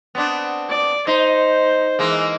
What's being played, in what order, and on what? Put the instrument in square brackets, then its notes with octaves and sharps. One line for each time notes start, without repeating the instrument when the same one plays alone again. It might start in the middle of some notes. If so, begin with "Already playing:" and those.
[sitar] B3 C4 D4
[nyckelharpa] D5
[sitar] D#4 [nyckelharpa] C5
[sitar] E3 G#3 A#3